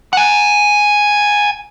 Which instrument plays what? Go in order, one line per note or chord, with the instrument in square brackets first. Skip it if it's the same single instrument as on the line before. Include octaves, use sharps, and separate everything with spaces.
[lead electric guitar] F#5 G#5